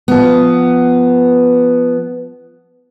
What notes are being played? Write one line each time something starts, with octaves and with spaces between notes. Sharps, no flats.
F3 B3